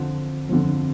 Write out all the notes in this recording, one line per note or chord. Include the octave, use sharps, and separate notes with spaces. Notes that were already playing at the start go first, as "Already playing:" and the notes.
Already playing: F2 D3 F3
F2 D3 F3